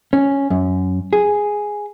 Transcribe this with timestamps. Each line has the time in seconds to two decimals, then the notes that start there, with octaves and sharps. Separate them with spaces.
0.13 C#4
0.50 F#2
1.13 G#4